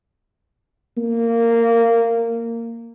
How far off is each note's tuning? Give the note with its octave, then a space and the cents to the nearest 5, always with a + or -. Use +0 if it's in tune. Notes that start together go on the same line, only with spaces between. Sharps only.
A#3 -15